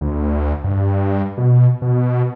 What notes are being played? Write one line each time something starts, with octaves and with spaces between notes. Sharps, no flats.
D2
G2
B2
B2